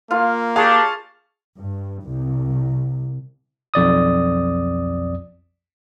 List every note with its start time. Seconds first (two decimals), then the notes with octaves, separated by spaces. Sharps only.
0.11 A#3 F4 F5
0.56 D4 G4 G#4 F5 A5 C#6
1.57 G2
2.04 C2
3.74 B1 F2 D5 D#6